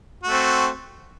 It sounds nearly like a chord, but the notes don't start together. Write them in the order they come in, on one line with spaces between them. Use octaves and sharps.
F#4 A3 C4